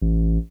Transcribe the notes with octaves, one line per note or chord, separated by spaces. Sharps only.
A1